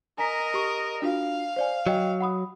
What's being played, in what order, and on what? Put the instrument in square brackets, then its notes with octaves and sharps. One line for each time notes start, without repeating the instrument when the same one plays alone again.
[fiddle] A#4 D#5 [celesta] G#5 A#5 B6
[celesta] G4 C#6
[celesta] D4 F4 F#4 [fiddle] F5
[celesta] C5 D5 G#5
[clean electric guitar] F#3 [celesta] D#5 G5
[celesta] F#5 B5 D#6